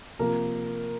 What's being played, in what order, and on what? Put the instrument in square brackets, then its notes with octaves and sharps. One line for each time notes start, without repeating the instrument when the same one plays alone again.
[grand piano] C3 F3 A#3 A#4